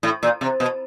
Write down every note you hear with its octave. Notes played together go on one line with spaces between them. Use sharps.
A2
A#2
C3
B2